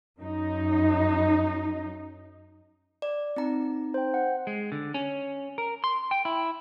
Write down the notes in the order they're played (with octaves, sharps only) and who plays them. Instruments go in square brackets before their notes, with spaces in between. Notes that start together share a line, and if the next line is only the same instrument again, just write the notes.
[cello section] F#2 D#4
[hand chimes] D5
C4 D#4 A#5
[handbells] C5 G5
F#5
[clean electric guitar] G#3
D3
C#4
A#4
C6
G5
E4